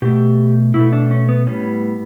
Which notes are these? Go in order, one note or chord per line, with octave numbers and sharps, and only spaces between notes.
B2 A3 G4
B2 A3 E4
D4
C#4
B3
A2 G3 B3 C#4